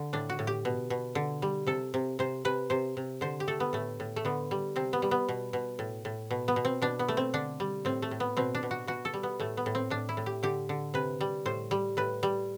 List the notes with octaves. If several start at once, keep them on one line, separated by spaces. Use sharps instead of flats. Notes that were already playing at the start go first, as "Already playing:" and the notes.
Already playing: D3
A2 D4
F#4
A2
G4
B2
B2
D3
G3
C3 A4
C3
C3 C5
C3 B4
C3 C5
C3
D3 C5
G4
A3 A4
B3
A2 A3
A2
A3
D3 B3
G3
C3 C4
B3
G3
B3
B2
B2
A2
A2
B2
B3
B2
C4
B2 D4
B3
A3
C4
D3 D4
G3
A2 C4
A3
A2
B3
B2 C4
D4
B2
F#4
B2 F#4
A4
G3
B3
A2 A3
B3
A2
C4
A2 D4
E4
A2
G4
D3 G4
D3
C3 B4
G3
A2 C5
G3
A2 B4
G3